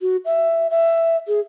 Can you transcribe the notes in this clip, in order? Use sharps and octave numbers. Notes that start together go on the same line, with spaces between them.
F#4
E5
E5
G#4